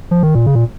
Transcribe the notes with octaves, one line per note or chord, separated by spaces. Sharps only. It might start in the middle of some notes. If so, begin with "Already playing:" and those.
F3
D#3
A#2
C#3
A#2